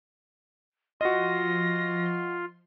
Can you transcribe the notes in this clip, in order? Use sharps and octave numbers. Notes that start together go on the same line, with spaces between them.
F3 F4 F#4 D#5 C6 A#6